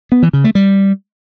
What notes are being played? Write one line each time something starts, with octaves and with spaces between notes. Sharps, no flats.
B3
E3
C#3
A3
G3